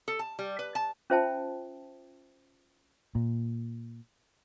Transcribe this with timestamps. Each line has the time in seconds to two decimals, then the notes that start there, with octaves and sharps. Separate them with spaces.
0.08 A4
0.19 A5
0.39 G3
0.59 B4
0.75 A5
1.10 C#4 F4 C5 E5 G5 A5
3.15 A#2